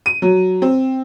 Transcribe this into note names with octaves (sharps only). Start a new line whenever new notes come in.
D#7
F#3
C4